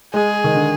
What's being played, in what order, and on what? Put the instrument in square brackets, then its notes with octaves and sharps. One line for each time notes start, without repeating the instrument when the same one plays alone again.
[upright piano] G#3 [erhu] G#4
[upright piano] D#3
D3